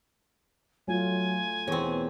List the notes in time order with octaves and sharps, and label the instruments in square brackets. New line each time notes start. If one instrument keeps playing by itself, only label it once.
[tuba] F#3 [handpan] A3 F4 [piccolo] G#5
[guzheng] E2 C4 [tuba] B2 [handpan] C#5